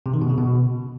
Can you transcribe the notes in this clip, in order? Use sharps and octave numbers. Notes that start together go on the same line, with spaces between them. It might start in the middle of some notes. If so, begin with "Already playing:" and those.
C3
D#3
B2
C#3
B2